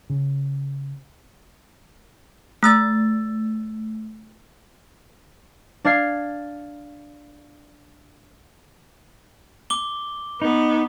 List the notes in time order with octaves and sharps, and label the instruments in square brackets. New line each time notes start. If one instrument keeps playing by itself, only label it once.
[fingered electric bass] C#3
[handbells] A3 E6 A6
[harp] D4 D5 F5 G#6 C7
[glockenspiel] D6 G7
[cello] B3 [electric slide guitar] D#4